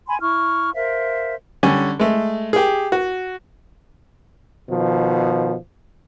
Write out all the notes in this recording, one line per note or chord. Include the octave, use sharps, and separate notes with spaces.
G#5 B5 C6
E4 C#6 F6
A#4 C5 E5 F5
D3 G3 C#4 G#5
G#3 A3
G4 G#4
F#4
B2 D#3 F3